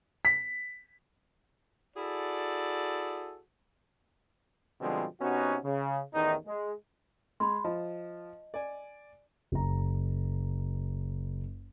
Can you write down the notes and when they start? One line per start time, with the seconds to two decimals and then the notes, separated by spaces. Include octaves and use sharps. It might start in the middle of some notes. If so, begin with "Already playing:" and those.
0.25 B6
1.97 E4 F#4 G#4 A4 D5
4.81 B2 D3 F3 G3 G#3 C4
5.20 C3 B3 C#4 D#4 F#4
5.64 C#3
6.14 A1 E2 D#3 D#4
6.46 G#3
7.40 G#3 B5 C6
7.64 F3 D#5
8.54 D5 G#5
9.52 F#1 A#5